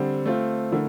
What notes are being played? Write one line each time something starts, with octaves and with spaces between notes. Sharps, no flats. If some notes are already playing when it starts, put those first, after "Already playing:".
Already playing: D3 G3 C4
A3 C4 F4
D3 A3 E4 A#4